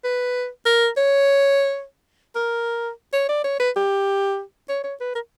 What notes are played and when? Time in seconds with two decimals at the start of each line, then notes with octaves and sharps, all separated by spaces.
0.04 B4
0.66 A#4
0.97 C#5
2.35 A#4
3.13 C#5
3.29 D5
3.44 C#5
3.59 B4
3.76 G4
4.69 C#5
4.84 C#5
5.00 B4
5.15 A#4